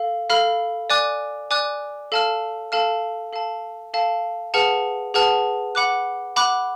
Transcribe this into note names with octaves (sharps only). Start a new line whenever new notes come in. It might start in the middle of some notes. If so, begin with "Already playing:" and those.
Already playing: A4 F5
A4 F5 B5 F6
D5 G#5 D6 F#6
D5 G#5 D6 F#6
A4 F5 A5 F6
A4 F5 A5 F6
A4 F5 A5
A4 F5 A5
G#4 B4 F#5 A5 F6
G#4 B4 F#5 A5 F6
F#5 B5 D6 F#6
F#5 B5 D6 F#6